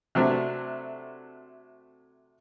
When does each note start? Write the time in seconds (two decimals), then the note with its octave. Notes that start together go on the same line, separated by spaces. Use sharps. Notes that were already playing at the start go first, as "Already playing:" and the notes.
0.15 C3 F#3 A3 C4 D4